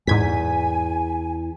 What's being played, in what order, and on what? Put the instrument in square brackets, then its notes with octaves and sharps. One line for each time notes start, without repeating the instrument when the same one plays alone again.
[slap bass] E2 [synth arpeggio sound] G#2 G#6 B6 [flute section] G#5